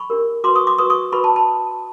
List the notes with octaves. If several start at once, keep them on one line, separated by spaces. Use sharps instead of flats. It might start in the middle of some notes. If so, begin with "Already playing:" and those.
Already playing: B5 C#6
D4 G4 A#4
F#4 B4 C6 D6
C#6 D#6
C6 D6
F#4 B4 C#6 D#6
C#6 D#6
F#4 B4 B5 C#6
A5 B5
A5 B5